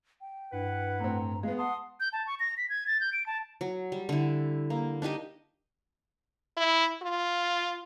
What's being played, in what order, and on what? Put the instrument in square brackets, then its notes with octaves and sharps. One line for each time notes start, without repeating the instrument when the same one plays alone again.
[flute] G5
[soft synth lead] G2 [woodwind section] E4 B4 F#5
[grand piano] A2 C4 [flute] A#5
[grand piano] G#3 B3 [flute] F5
[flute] F#5 [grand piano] A5 [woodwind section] C6 D#6
[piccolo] G6
A5
C#6
A#6
B6
G#6
A6
G6
D7
A5
[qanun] F#3
G3
D3 E4
A#3
D4 D#4 G4 D#5
[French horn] E4
F4